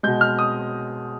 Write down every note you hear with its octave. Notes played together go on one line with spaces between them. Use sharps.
B2 G#3 G6
F6
D#6